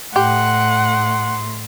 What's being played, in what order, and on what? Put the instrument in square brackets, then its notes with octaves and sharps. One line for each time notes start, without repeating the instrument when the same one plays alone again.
[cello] A2 [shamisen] G4 [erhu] F#5 [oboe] C6